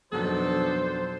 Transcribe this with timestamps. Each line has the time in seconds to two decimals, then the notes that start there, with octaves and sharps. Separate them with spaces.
0.12 F2 B2 D#3 F#3 B3 D4 A4 C5